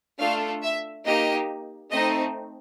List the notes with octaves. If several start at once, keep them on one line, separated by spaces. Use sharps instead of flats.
A3 D4 F4 A4 F5
E5
A#3 D#4 G4 D#5
A3 C4 D#4 D#5